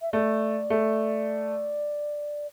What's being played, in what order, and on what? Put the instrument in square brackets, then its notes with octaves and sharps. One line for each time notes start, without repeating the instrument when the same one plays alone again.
[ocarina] E5
[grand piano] A3 [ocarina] D5
[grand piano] A3